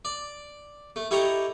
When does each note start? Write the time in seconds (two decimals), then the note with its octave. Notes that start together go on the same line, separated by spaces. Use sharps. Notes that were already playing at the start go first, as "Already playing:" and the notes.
0.05 D5
0.96 A3
1.11 E4 G4 A4 C#5 D#5 A#5